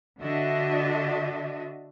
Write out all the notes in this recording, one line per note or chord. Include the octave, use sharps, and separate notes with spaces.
D3 D4 F#4 D#5 E5